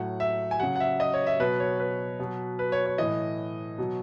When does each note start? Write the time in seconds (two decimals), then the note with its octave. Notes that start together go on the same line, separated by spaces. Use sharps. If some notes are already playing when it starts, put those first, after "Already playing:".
Already playing: A2 F#3 F#5
0.20 E5
0.51 G#5
0.60 C#3 F#3 F#5
0.76 F#5
0.80 E5
1.00 D#5
1.14 C#5
1.27 E5
1.40 B2 F#3 B4
1.60 C#5
1.80 B4
2.20 B2 F#3
2.59 B4
2.72 C#5
2.86 C#5
2.98 A2 E3 D#5
3.78 B2 F#3